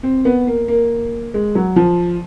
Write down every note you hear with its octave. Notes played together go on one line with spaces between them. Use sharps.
C4
B3
A#3
A#3
G#3
F#3
F3